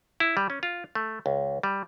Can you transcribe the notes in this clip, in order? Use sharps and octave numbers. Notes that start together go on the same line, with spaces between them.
E4
G3
C#4
F4
A3
C#2
G3